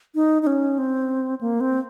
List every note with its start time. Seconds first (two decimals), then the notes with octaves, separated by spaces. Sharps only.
0.15 D#4
0.42 D#4
0.47 C#4
0.78 C4
1.41 A#3
1.61 C4